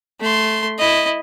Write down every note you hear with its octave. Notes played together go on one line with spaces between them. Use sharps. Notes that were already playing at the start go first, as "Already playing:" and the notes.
A3 C6
E4 D#5